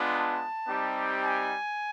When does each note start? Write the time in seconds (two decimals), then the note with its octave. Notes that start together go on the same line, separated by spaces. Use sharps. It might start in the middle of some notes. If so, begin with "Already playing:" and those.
Already playing: G#3 B3 D4 F4
0.13 A5
0.67 G3 C4 D#4 G4
1.22 G#5